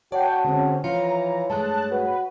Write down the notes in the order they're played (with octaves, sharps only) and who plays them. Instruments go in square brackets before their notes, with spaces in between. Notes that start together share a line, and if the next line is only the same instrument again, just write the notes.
[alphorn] F#4 [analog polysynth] C#5 F#5 G5 [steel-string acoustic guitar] D5 [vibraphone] A5
[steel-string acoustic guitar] F2 G#3 [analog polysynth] D3 C4 C#4
[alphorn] E3 [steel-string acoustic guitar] F3 F4 [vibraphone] C#5 [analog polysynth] A#5
[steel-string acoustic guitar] G2 G#3 A3 [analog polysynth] A5 F#6
[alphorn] F#4 [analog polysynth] B4